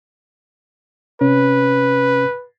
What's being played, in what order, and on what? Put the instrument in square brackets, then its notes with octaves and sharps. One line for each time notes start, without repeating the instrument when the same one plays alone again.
[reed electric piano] C3 C#4 [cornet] B4